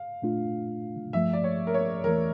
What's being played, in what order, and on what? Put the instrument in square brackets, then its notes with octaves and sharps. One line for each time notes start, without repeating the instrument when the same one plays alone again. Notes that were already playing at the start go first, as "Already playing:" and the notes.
Already playing: [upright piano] F5
[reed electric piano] A#2 A3 D4 F4
[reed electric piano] G2 F3 A3 [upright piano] E5
[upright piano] D5
C#5
A#4
C#5
[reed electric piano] E2 E3 A3 [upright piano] A#4